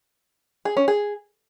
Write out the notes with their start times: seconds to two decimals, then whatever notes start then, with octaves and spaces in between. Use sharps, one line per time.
0.65 G#4
0.77 C#4
0.88 G#4